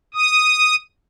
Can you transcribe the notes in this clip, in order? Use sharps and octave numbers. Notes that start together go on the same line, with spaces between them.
D#6